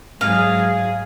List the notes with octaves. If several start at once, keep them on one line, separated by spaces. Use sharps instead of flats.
G#2 F#3 G#4 F5